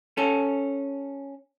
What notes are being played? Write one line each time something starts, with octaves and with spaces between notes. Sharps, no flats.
C#4 A4